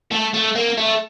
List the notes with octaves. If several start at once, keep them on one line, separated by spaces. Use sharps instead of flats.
A3
A3
A#3
A3